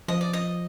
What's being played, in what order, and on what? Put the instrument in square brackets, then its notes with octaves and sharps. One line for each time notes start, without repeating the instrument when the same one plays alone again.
[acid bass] F3 [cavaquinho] D#5
[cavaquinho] D5
D#5